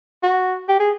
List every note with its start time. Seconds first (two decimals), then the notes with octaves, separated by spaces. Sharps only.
0.23 F#4
0.69 G4
0.80 G#4